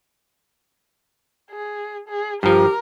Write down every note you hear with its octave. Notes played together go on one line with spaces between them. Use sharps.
G#4
G#4
G2 F3 G4 A#4